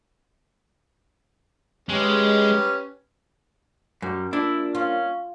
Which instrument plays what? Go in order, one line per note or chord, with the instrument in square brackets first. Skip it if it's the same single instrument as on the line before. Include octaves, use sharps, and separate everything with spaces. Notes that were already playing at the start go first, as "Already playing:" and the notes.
[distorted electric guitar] G#3 [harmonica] C#4 G4 B4
[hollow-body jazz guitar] F#2 [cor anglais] G3
[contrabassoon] A#2 [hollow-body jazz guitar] D4 [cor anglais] E4
[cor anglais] C#4 [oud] F4